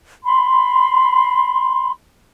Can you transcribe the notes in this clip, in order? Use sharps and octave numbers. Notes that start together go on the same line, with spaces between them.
B5 C6